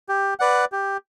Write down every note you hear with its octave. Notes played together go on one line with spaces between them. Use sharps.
G4
B4 D5 F#5
G4